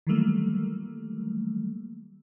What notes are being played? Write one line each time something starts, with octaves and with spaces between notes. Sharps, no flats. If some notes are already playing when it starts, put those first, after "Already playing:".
D#3 E3 F#3 G3 A3 A#3